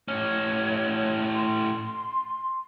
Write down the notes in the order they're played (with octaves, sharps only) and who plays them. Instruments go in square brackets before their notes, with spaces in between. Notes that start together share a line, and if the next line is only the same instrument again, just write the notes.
[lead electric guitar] A2 C#4 [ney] C#5
[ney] C6